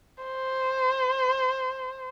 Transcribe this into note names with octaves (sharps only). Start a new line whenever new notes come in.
C5